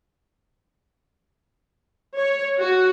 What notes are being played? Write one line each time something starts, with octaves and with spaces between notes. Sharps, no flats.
C#5
F#4